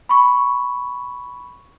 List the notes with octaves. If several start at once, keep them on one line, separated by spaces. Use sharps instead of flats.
B5 C#6